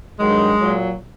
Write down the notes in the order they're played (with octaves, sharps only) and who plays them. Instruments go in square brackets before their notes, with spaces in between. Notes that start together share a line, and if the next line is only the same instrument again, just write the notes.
[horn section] G2 D#3 F#3 G#3
A#2 F#3